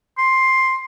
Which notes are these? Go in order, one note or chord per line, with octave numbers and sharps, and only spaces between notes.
C6